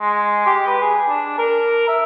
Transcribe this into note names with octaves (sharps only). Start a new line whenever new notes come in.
G#3
G4
B4
G#4
D4
A#4
E5